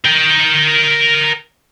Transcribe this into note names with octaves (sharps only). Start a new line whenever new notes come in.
A#4 G5